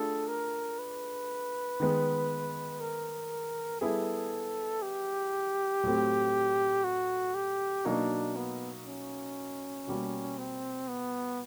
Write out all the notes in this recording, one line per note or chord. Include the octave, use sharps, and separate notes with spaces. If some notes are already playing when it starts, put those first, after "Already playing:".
Already playing: A3 D4 F4 G#4 A4
A#4
B4
D#3 G#3 B3
A#4
G3 B3 E4 G#4 A4
G4
A2 F#3 A3 C4
F#4
G4
B2 F#3 A#3 D4 D#4
B3
C#4
B2 G3 A#3
C4
B3